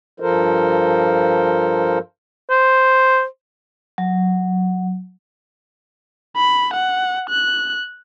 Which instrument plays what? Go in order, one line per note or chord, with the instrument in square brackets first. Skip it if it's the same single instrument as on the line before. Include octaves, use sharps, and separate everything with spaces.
[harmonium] G2 F3 F4 A4 A#4 C5
[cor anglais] C5
[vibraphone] F#3
[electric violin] B5
F#5
F#6